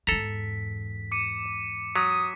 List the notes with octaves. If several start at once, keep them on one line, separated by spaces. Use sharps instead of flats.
E2 G#2 A4 A#5 B6
D6 C#7 D#7
F#3 D#6 B6